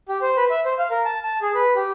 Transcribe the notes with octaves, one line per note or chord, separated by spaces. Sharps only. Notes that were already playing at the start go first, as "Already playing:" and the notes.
G4
C5
B4
E5
C5
F5
A#4
A5
A5
G#4
B4
G4